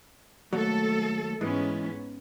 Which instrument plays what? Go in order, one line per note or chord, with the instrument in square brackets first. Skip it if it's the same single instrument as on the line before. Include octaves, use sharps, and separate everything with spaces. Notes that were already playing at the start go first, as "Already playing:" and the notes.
[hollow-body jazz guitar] D#2 G#2 F#3 [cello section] A3 A4
[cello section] G#2 B3 C#4 [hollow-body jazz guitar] E3 G#3